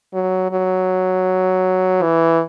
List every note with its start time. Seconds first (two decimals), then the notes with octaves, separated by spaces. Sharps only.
0.14 F#3
0.52 F#3
2.02 E3